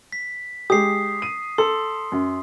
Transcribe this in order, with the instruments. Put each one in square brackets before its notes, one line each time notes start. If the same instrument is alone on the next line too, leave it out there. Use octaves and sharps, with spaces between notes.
[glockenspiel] B6
[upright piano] G#3 G4 [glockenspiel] D#6 C7
[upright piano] D#7
[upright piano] A4 [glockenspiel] C6
[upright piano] F#2